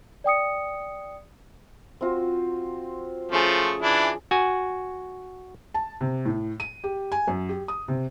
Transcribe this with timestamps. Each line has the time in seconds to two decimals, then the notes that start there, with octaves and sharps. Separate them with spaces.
0.24 D5 G5 D#6 C#7
2.01 C4 F4 F#4
3.32 F3 A3 C#4 G#4
3.82 E3 D4 E4
4.31 F#4 G#5
5.74 A5
6.01 C3
6.25 A2
6.60 D#7
6.84 G4
7.12 G#5
7.28 F#2
7.49 G4
7.68 D#6
7.88 C3